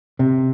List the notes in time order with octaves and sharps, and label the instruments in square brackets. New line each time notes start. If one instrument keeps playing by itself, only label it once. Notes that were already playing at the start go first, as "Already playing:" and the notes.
[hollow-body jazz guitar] C3